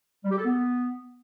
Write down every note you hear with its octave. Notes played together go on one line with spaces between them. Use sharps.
G3
G4
A4
B3